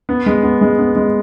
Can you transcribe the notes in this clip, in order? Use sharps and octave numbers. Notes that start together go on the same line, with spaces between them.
B3
G#3
B3
G#3
B3
G#3